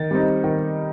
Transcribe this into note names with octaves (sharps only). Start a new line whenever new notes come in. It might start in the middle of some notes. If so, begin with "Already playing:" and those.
Already playing: D#3 A6
G3 C4 D#4
D#3